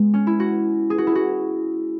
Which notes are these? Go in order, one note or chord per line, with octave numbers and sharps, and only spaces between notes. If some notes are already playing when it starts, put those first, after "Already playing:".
Already playing: G#3 B3
C#4
E4
F#4
G#4
F#4
E4
F#4